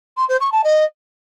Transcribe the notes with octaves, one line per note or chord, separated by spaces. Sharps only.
C6
C5
C#6
A5
D#5